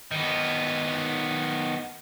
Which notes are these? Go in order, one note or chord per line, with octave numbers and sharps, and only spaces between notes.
D#3 B3